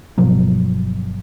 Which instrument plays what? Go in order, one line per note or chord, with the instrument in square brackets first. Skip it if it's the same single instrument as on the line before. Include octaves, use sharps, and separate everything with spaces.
[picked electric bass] G1 B2 F3 F#3